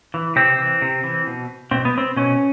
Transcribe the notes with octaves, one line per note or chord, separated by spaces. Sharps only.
E3
C3 C4
E3
C3
E3
B2
B2 C4
B3
C4
B2 C#4